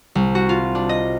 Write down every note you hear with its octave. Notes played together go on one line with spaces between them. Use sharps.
C2
F#4
F4
D4
D#5